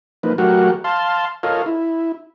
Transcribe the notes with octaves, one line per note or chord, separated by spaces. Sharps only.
F3 A#3 D#4 B4
F#3 A3 F#4 G4 A#4 F#5
F5 A5 C6
F4 A4 A#4 C#5 D#5 F5
E4